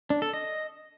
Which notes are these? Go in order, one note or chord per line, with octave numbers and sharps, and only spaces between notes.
D4
A4
D#5